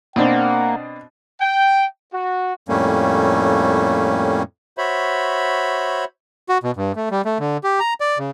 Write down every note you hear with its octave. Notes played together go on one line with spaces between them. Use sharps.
B2 A#3 C4 D4 F#5
G5
F#4
F2 A2 G3 A3 A#3 C#4
F#4 C5 C#5 E5 B5
F#4
B2
G2
A3
G3
A3
D3
G4
A#5
D5
C#3